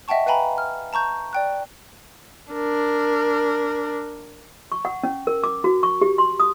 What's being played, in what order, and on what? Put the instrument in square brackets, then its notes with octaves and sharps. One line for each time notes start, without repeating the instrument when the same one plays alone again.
[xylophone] D#5 E5 F#5 G5 A5 C#6
B4 F5 G5 G#5 A#5 B5
F6
A5 A#5 C#6 G6
D5 G5 F#6
[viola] D4 A#4
[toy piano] C#6
F#5
C#4
A#4
D6
F#4
C#6
G4
C6
D#6